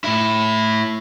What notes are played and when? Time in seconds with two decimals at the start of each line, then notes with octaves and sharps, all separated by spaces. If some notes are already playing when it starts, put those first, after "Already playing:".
0.04 A2 E4